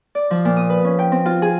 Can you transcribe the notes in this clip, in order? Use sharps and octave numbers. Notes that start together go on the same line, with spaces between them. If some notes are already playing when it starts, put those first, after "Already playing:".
D5
F3
A#2
D#6
B4
C#4
G5
C4
F4
G#4